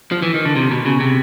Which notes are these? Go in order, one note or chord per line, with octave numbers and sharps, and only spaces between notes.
F3
E3
D#3
D3
C3
B2
C#3
C3